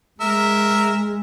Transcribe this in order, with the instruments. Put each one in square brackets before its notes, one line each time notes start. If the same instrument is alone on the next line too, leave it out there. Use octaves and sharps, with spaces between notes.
[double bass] G#3 [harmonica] A#4 E5